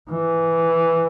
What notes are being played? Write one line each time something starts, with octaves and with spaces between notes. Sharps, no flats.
E3